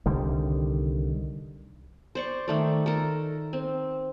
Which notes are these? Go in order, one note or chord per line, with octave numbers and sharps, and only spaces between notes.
C2 D3 D#3 G3
C5 D5 C#6
D#3 A3 D5
A4 A#4
C4